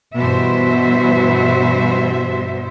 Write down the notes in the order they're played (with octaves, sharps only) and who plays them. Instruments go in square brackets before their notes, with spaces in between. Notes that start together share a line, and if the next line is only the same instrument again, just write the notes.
[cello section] G2 B2 E3 C5 E5